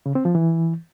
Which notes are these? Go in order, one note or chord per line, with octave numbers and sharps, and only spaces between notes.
C#3
C4
F3
E3